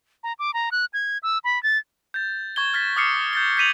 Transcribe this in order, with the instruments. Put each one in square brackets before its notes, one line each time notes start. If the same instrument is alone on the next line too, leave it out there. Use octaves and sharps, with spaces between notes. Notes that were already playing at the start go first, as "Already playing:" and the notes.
[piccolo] A#5
D6
A#5
F#6
G#6
E6
B5
A6
[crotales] G6 A6
C#6 G#6 G7
F6 A6 B6
D6 D#6 F6 C7 C#7
G6 A6 G7
G6 B6 D#7 F7 F#7